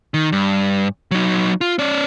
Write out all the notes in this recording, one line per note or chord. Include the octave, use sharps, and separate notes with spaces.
D#3
G2
F#3 D#4
F4
C#4 D5